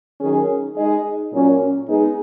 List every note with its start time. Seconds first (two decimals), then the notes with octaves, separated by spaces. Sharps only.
0.20 D#3 F#3 C#4 G#4
0.76 G#3 D#4 G#4 D#5
1.32 A#2 F#3 C#4
1.89 G#3 B3 D#4 G#4